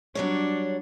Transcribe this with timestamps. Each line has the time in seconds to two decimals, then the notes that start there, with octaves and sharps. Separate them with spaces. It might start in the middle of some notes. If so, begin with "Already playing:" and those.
0.15 F#3 G3 D4 C#5